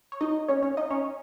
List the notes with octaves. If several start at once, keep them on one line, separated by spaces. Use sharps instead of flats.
C#5
D#4 D#5
C#4 C#5
C#4 C#5
D#4 D#5
C#4 C#5